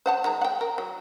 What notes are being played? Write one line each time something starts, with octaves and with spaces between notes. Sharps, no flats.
C5 F#5 A5
D#3 G#3 A#5
F#5 G5
A#4
F#3